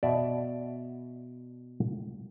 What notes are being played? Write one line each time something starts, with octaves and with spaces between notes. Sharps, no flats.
B2 D5 E5